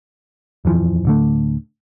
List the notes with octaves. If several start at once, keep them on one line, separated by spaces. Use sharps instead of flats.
D#1 F2 E3 F3
D1 D3 A3